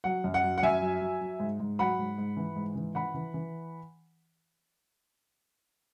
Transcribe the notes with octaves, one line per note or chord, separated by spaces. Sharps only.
F#3 F#5
F#2
F#5
F#3
F#5
F#2 E5 G#5
F#3
F#3
F#3
G#2
G#2
F#3 F#5 B5
G#2
G#2
E3
G#2
E3
E3 F#5 B5
E3
E3